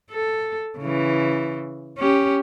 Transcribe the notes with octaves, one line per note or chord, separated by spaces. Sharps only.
A4
C#3 E3
C#4 G4